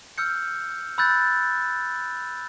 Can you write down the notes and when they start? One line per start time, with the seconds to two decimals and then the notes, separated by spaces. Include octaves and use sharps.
0.18 E6 F6 G6 C#7
0.98 B5 E6 F#6 G6 A6